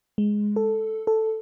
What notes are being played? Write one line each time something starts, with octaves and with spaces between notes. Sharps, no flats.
G#3
A4
A4